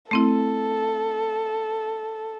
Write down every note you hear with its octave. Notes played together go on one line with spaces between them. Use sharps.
A3 C4 E4 A4